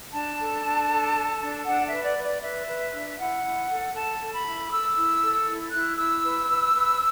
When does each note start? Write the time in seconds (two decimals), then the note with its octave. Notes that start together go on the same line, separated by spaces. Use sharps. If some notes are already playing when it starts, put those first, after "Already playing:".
0.13 D4 A5
0.39 A4
0.64 D4
0.90 A4
1.15 A4
1.41 D4
1.66 D4 F#5
1.85 E5
1.92 B4
2.03 D5
2.17 B4
2.23 D5
2.41 B4 E5
2.67 B4
2.92 D4
3.18 E4 F#5
3.43 E4
3.68 A4
3.94 A4 A5
4.19 A4
4.33 B5
4.45 E4
4.70 A4 E6
4.95 E4
5.20 A4
5.47 E4
5.72 E4 F#6
5.97 E4 E6
6.23 B4
6.48 B4
6.73 B4